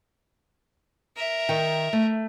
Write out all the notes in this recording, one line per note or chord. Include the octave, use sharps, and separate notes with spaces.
A#4 E5
D#3 G5
A3